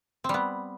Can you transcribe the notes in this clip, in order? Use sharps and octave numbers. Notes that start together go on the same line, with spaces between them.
G3 B3 C4